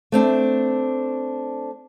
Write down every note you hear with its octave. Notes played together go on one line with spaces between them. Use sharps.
A3 C4 D4